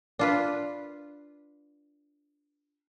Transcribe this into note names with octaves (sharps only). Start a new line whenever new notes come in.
D4 F4 B4